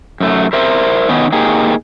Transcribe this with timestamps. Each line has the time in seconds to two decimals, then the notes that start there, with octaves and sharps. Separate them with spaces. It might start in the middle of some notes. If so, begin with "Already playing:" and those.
0.20 F#2 A3
0.53 A#4 C5 E5
1.09 D#3 B3 C#4 D#4
1.32 A#3 D#4 G4 G#4